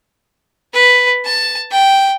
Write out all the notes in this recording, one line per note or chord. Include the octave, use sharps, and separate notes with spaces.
B4
A5
G5